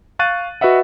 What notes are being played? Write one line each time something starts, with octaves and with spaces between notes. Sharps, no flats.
F5 C#6 F#6 A6 D#7
F#4 B4 D#5 E5 F#5